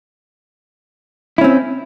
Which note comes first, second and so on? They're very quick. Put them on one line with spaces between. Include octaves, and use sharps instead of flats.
E4 C#4 C4